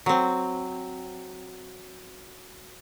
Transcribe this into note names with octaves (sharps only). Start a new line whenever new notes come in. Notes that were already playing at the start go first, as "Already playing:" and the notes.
F#3 C4